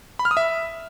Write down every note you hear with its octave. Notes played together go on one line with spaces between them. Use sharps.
B5
F6
D#6
E5